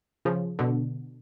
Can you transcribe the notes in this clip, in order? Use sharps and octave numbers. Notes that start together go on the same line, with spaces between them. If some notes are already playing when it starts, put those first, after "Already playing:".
C#3 F3
B2 D3